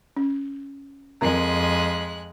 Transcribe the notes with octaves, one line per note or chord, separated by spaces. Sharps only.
C#4
F2 G#3 C4 A#4 A#5 F#6